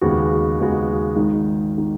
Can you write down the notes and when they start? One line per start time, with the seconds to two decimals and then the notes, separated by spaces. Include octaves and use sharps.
0.01 D#2 C#3 G#3 B3 F#4
0.59 D#2 C#3 G#3 B3 F#4
1.16 G#1 G#2 D#3
1.78 D#3